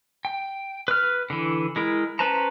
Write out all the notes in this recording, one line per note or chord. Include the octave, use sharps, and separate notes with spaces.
G5
B4 F6
D3 E3
G#3 E4 A#4
C#4 B4 C5 A5 A#5